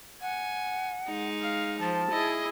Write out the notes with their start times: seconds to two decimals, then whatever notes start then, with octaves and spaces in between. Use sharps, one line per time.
0.22 F#5 G#5
1.07 G#3 D#4
1.41 F5
1.80 F3 A5
2.12 E4 G#4 D#5